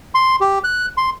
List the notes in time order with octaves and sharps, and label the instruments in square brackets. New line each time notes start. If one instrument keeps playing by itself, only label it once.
[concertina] C6
G4
F#6
C6